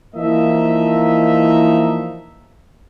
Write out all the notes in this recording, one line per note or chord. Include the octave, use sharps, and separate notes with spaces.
E3 F3 A#3 D#4 D#5 E5